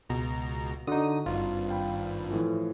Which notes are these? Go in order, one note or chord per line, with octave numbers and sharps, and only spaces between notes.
C#2 B2 A#5
D3 D#4 F#4 D#6
G#1 G2 F4
F5 G5 B5
A2 E3 F3